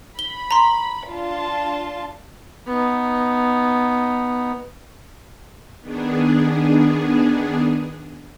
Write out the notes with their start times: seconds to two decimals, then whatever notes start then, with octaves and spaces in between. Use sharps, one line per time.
0.19 B5 G7
0.51 A#5 C6
1.10 D4 F4 A5
2.67 B3 D#4
5.81 D#3 B3 D4 G#4